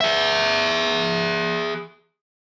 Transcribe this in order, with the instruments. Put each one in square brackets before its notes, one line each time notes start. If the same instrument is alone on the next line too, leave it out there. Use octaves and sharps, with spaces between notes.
[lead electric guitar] G#4 E5